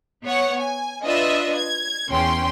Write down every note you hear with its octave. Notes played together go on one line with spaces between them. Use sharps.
B3 C#5 F#5
G#5
D4 F4 B4 D#5 E5
G#6
E2 C#4 G5 C6